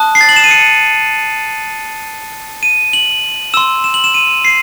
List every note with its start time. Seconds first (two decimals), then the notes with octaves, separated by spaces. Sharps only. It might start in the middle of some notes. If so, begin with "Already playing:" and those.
Already playing: A5 D#6 F#6
0.15 C7
0.21 A6
0.29 F#7
0.36 E7
0.44 D#7
0.51 C#7
2.63 D#7
2.93 F#7
3.54 C6 E6 E7
3.84 E7
3.94 F#7
4.04 E7
4.14 D#7
4.45 C7